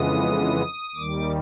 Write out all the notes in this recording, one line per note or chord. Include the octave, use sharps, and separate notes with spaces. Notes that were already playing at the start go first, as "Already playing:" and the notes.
Already playing: F2 C#3 E3 G#3 B3 D#6
D#2 D#3 G3 D6